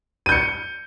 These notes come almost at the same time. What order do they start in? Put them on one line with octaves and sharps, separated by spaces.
D#7 G6 C#7